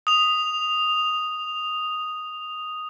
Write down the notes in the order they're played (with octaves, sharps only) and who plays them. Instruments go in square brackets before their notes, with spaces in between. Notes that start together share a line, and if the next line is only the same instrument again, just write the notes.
[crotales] D#6 F7